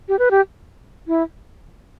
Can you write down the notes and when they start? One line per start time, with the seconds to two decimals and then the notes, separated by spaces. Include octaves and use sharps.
0.09 G4
0.19 B4
0.31 G4
1.08 E4